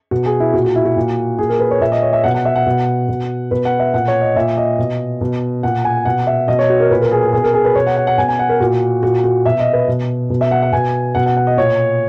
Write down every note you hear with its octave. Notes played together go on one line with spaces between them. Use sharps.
B2 F#4
G#4
E4
A#2 F#4
F#4
E4
F#4
A#2
A#2 G#4
A#4
B4
C#5
A#2 E5
D#5
C#5
E5
B2 F#5
F#5
E5
F#5
B2
B2
B2 B4
F#5
E5
A#2 F#5
C#5
D#5
A#2 E5
D#5
B2
B2
A#2 F#5
G#5
B2 F#5
E5
B2 D#5
C#5
F#4
A#4
A#2 B4
A#4
G#4
G#4
B2 G#4
A#4
G#4
B4
B2 C#5
F#5
F#5
F#5
B2 G#5
G#5
F#5
A#4
A#2 F#4
A#2 F#4
F#4
B2 E5
D#5
B4
B2
B2
E5
F#5
F#5
B2 G#5
B2 F#5
F#5
F#5
D#5
A#2 C#5